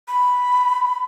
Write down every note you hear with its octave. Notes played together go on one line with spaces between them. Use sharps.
B5